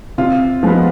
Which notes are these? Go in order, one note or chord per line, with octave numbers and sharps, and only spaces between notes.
C3 F4
F3 G#3 B3